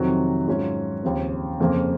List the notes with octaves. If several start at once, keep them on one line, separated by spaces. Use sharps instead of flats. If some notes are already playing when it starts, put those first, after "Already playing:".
Already playing: F2 C3 D#3 F#3
G#2 F#3 C#4 F4
D#2 C#3 F3 C4
F2 C#3 F3 A#3